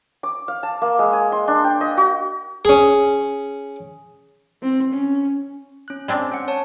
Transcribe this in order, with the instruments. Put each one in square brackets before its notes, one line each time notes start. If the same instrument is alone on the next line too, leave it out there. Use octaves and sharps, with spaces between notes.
[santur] D6
F5
A5
A#3
G#3
G#5
C6
D4
G5
D#5
F#4
[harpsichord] C#4 G#4
[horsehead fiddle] C4
C#4
[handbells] C#4 F#6
[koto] G#3 C4 D4
[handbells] C#4 F#5
C#5 A5